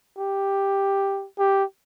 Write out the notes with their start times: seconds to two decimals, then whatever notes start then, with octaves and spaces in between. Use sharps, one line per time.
0.18 G4
1.39 G4